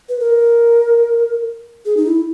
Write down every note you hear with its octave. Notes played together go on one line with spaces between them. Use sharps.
B4
A#4
G#4
D#4
E4